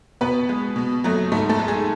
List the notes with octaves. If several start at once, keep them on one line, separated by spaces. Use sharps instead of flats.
B2 B3 B4
G#3
B2
F#3 A3
G#2 A3 A4
A3 A4
G#3
G#4